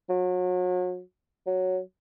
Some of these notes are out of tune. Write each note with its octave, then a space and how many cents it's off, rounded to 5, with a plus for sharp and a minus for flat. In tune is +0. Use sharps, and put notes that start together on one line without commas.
F#3 -35
F#3 +0